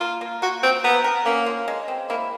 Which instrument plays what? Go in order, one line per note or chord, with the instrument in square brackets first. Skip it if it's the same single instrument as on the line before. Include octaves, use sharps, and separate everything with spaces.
[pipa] A#3 [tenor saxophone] F4
[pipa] A#3
[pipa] A#3 [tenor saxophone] F#4
[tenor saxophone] C4 [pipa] F4
[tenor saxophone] B3 [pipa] A#4
[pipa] A#4
[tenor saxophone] A#3 [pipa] C#4
[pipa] F4
G#3
C4
[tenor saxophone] A#3 [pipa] E4